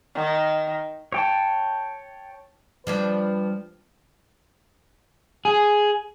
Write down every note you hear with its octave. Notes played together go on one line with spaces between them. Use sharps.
D#3
C#5 G5 A5
F3 G3 D4 B4
G#4